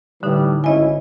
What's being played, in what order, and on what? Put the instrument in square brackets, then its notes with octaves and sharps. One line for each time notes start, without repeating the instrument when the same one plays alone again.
[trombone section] A2 E3 G3 [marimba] D3 D#4
[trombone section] G#1 C#4 E4 [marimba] C#5 D#5 G#5